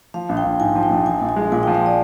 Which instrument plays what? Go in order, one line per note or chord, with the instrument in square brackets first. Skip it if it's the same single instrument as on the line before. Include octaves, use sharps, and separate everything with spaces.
[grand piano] F3 [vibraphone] F5
[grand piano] A#1
[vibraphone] G5
[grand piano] A#1
[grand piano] G#2 [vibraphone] G#5
[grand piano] F3
[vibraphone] G5
[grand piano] A#1
[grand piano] F3 [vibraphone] G#5
[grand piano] A#1
[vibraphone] G#5
[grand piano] G#3
[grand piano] A#2 [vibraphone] G#5
[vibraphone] G5
[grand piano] F3
[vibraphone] F5
D5